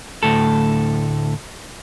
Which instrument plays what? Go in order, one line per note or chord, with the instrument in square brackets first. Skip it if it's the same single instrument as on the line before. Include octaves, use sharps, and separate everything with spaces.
[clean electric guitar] D2 A2 A4